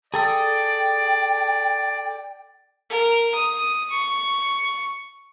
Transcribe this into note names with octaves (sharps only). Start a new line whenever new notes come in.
G#4 A4 D5 G5 D#6
A#4
D#6
C#6